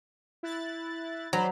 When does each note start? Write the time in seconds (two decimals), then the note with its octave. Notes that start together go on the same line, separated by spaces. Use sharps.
0.43 E4 F#6 A6
1.33 F#3 C5 D5 B5